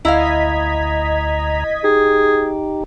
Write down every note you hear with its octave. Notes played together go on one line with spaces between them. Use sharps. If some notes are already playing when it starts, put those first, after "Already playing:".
D2 E4 D#5 F5 A#5 G#6 B6
D#4 G4 G#4